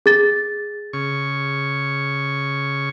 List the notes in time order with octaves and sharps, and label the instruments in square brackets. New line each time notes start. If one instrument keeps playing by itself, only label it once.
[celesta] G#4 A6
[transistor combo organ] C#3 C#6